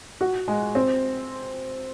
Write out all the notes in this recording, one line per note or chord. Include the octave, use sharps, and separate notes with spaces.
F#4
G#3
C4